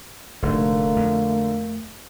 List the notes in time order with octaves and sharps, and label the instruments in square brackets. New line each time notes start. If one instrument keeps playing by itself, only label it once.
[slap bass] F1 G#2 [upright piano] D3 [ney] A3 [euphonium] A#3
[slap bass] F2